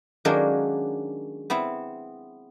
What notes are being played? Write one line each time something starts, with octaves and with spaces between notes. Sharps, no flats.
D#3 F#3 G#3 A#3 C#4 D4
B3 C4 E4